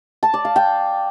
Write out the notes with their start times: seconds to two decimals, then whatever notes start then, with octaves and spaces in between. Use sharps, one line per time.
0.23 A5
0.34 D5
0.45 F5
0.56 G5